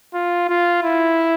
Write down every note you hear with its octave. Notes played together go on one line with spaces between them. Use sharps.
F4
F4
E4